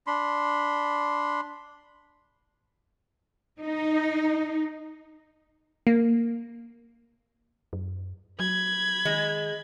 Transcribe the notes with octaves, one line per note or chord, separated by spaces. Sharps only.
D4 B5 C6
D#4
A#3
F#2
F#3 B5 G#6
D#3 G#3